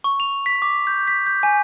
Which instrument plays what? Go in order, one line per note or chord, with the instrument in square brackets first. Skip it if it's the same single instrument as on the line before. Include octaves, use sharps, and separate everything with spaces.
[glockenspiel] C#6
F7
B6
D6
G6
B6
G6
G#5